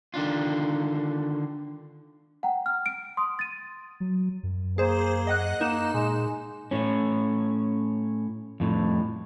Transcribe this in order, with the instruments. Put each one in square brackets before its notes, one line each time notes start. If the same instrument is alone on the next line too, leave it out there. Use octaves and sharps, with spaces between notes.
[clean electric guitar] D3 D#3 D4 F4
[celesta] F#5 G5 A#5
F6
D7
C6 D#6
A6 D#7
[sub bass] F#3
F#2
[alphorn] A#3 [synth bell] G#4 C5
[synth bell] D#5 F#5 F#6
[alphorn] A#3 [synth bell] D#4 E7
[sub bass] A#2 [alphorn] G#3
[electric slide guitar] A2 C#4
F2 A2